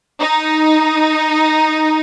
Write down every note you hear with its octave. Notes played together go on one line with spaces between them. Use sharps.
D#4